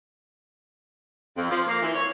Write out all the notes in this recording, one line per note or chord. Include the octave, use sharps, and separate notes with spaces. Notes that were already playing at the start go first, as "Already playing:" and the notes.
F2
F3
A#3
E3
C#5